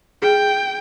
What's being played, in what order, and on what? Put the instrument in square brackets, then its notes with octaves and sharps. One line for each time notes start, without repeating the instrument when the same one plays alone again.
[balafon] G#4 [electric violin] G5